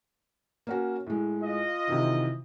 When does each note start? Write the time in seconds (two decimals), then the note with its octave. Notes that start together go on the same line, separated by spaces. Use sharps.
0.67 A#3 C#4 F#4
1.06 A2 G#3
1.42 F4 D#5
1.87 C3 D#3 E3